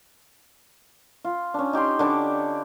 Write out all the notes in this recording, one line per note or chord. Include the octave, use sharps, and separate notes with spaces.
F4
C#4 D4
D#4 G4 G5 C6
D3 D4 B5 D6